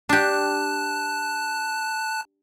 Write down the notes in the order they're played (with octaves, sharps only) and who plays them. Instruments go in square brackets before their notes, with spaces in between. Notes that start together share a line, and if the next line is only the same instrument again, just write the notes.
[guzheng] D4 G4 [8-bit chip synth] A5 F#6